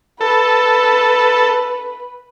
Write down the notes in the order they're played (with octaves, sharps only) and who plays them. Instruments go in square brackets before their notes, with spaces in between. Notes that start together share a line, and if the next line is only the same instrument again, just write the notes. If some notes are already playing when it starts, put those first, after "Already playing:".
[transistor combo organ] A4 [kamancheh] B4